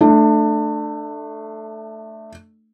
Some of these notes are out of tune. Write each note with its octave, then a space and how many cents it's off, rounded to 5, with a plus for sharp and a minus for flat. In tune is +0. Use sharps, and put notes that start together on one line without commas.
A3 +0 D4 +25